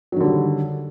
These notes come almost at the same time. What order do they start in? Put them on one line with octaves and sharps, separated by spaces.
F#3 D#3 D3 G3